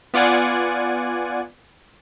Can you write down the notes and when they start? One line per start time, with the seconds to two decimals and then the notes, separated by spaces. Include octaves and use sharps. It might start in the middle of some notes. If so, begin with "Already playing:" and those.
0.14 B3 F4 D5 F#5 G#5